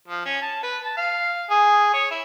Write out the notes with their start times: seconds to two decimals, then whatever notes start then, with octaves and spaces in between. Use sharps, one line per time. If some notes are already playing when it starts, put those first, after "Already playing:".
0.08 F3
0.25 C#4
0.42 A5
0.63 B4
0.84 A5
0.97 F5
1.50 G#4
1.94 C#5
2.11 E4